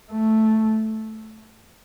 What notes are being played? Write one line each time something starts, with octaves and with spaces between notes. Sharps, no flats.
A3